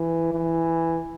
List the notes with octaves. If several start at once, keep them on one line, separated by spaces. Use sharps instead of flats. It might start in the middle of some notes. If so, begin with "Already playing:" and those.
Already playing: E3
E3